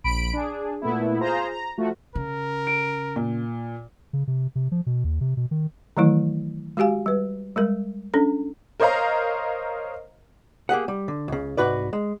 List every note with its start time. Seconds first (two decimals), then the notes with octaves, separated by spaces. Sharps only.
0.04 A#1 B5 D7
0.33 D4 G#4
0.82 A#2 A3 B3 E4
1.20 F4 G#4 C5 A#5
1.50 A#5
1.78 F3 A3 F#4
2.15 C#3 A#4
2.67 D7
3.16 A#2
4.13 C#3
4.28 C3
4.55 C3
4.72 F3
4.86 B2
5.04 D#2
5.21 C3
5.37 B2
5.51 D#3
5.97 D#3 E3 F#3 A3 E4
6.77 G#3 F#4 G4 F5 G#5
7.06 G3 B4
7.56 G3 G#3 A#4
8.14 C#4 D4 A4
8.80 A#4 C5 C#5 D#5 F5 A#5
10.69 A#3 G4 G#4 F#5
10.88 G3
11.08 D3
11.28 C#2 C#3
11.57 C2 G#2 F#4 B4 D5
11.93 G#3